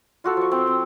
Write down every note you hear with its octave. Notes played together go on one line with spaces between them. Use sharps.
F4 F#4 A4
F3 C#6
C4 G5
C4